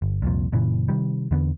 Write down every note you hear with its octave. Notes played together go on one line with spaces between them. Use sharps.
G1
C2 F2 A#2
F#1 A#2 C#3 E3
C3 D#3 G3
E2 D3 B3